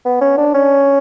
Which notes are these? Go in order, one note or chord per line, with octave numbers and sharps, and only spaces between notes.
B3
C#4
D4
C#4